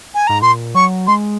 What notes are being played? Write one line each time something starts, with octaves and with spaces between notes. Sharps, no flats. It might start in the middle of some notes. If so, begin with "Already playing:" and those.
G#5
G#2 A#5
A#2 C6
F#3 C#6
G#3 C6